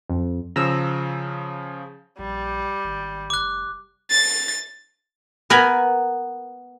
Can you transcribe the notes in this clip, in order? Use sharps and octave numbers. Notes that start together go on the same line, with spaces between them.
F2
C#3 F3 A#5 E6
A#1 G3
G#1
F1 D6 F#6
A6
B3 A#4 G#5 A#5 B5